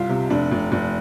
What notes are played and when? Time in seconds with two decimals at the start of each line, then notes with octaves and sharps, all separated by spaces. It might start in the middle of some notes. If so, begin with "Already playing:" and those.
Already playing: C2 F4
0.09 C3
0.30 F1 D4
0.51 F1
0.72 F1